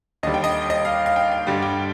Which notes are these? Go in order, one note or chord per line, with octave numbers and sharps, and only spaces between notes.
D#2 D3 G3 D#5
G5
D#5
D#5
F5
F5
G5
F5
G2 D3 G3
G5